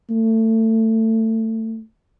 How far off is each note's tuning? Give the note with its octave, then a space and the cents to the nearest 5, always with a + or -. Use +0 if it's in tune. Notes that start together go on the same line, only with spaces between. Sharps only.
A3 +25